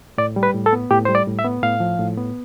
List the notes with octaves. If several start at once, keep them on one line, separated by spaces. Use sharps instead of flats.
A2 D5
G3
B4
A2
A4
B3
A2 G4
G3 C5
D5
A2
E5
B3
A2 F5
F3
A2
B3